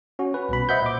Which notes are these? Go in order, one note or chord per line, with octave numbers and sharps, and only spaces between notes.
C#4 F#4
B4
C2 B2 B5
C5 D#5 E5 F#5 B5 G6
A#2 D6